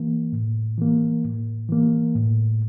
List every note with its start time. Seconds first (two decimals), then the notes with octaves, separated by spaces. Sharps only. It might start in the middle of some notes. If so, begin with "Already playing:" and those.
Already playing: E3 A#3
0.32 A2
0.78 E3 A#3
1.24 A2
1.69 E3 A#3
2.15 A2